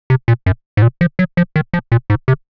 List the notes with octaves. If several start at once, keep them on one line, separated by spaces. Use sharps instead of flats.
C3
A#2
F#2
G#2
A#2
F3
F#3
F3
D#3
F3
A#2
G#2
C3